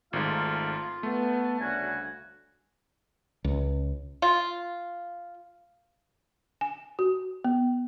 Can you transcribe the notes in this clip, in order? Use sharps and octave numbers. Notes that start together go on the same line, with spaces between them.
G#1 G#2 A3 F4 F5
A3 B3 A5
D2 C#3 G3 F#4 G#5
C#2
F4
G#5
F#4
B3